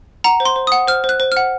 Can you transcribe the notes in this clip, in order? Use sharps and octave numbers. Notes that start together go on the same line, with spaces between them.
F#5 A#5
C5
C6
C5
D#6
F#5
C5 F6
C5
F#6
C5
F6
F#5